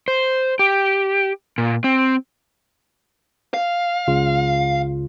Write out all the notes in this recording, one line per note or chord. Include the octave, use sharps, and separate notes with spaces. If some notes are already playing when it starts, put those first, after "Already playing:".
C5
G4
A#2
C4
F5
C#2 C#3 F4